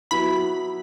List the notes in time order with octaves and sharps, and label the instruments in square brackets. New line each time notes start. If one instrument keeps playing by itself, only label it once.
[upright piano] F#3 B3 E4 [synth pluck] B5